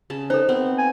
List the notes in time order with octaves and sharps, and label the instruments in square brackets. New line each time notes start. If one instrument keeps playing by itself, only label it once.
[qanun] C#3 A5
[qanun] D#4 [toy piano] A4 C5
[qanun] B3 C4
[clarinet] G#5